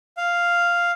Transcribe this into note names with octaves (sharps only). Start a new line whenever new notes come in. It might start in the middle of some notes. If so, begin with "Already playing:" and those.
F5